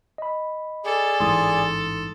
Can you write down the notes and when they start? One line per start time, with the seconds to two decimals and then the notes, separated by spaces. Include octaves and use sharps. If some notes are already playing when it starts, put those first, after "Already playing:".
0.18 D#5 B5
0.85 G#4 A4 D5
1.20 A1 G#2 E3 C6 D#6